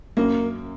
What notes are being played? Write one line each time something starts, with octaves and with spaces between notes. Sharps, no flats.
F#2 A#3